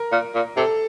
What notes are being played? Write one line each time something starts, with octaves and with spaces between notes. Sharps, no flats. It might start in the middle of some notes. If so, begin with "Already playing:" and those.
Already playing: A#4
A#2
A#2
C3 A4